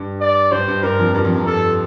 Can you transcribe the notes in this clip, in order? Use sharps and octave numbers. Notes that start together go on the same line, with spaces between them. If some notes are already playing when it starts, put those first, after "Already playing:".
Already playing: G2
D5
G2 C5
G2
G2 A#4
F2
G2 A#4
F2
G2
G2 A4